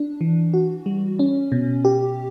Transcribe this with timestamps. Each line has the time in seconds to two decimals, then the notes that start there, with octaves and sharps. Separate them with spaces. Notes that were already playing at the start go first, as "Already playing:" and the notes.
Already playing: D4
0.21 E3
0.54 F#4
0.86 G3
1.19 C#4
1.52 B2
1.85 G4